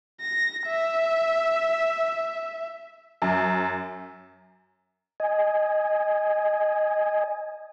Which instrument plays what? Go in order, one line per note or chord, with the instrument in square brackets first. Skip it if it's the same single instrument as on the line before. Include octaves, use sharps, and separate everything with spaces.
[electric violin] A#6
E5
[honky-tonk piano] F#2
[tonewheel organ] D#5 G#5